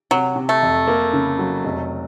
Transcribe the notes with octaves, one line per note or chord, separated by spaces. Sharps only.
C3 F#3
C3
A3
F2
A#3
C#3
F#3
F1